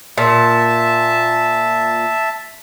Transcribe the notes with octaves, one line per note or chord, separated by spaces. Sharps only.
A#2 E5 A5